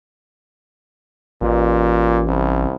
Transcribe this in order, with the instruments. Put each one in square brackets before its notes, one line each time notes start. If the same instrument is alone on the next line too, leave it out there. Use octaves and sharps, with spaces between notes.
[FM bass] A1 [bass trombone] A#2
[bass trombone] C2